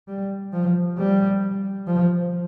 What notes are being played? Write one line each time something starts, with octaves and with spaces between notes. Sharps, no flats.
G3
F3
G3
F3